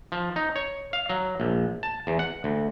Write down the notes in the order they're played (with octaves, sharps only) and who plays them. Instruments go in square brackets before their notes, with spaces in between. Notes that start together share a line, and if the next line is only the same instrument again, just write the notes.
[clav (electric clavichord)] F3
D#4
C#5
F5
F#3
A#1
A5
E2
F#5
D2